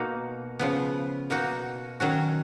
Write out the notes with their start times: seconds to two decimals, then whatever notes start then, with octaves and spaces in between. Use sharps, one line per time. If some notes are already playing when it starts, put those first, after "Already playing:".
Already playing: B2 A#3 D#4 F#4
0.59 C#3 F3 B3
1.30 B2 A#3 D#4 F#4
2.00 D#3 F#3 C#4 F#4